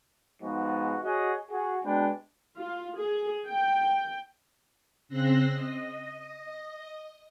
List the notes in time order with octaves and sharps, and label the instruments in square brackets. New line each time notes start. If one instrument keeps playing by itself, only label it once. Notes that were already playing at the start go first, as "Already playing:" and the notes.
[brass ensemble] G#2 F3 G#3 B3 F#4 D#5
F#4 G#4 C#5 D#5 F#5
F#4 G#4
B2 G#3 D4 B4 G5
[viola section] F4
G#4
G5
[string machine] C#3 C4 C6 E6 F#6 A#6
D#5